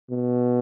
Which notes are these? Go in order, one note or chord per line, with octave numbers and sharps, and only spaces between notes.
B2